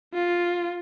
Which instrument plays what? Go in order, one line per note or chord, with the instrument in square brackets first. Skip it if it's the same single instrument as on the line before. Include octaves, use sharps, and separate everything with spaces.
[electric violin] F4